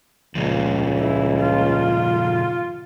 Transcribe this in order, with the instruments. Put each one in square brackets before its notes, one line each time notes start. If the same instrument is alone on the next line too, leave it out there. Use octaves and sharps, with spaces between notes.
[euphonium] C#2 [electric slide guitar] A#2 C#3 F3
[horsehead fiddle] E4
F4